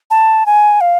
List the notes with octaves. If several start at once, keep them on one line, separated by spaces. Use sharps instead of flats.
A5
G#5
F5